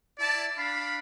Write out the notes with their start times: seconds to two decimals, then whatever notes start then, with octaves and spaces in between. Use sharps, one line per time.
0.19 E4 D5 A5
0.58 D4 F5 B5